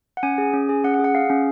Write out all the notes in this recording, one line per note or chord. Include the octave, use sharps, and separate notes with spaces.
F#5
C#4 G#5
G#4
C#4
G#4
C#4 F#5
F#5
G#4
F#5
G#4 F5
C#4